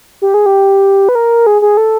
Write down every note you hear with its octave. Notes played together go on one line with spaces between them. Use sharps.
G4
G#4
G4
B4
A#4
G#4
G#4
A4